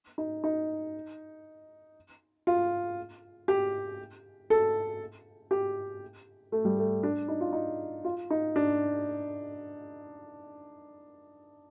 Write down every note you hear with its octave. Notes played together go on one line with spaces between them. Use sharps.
D#4
D#4
F4
G4
A4
G4
A3
G3
A3
D4
D#4
F4
D#4
F4
D#4
D4